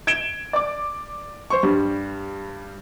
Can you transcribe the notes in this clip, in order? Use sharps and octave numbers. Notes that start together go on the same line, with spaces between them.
G#6 D7 E7 G7
D5 D6
C5 C6 C#6
G2 G3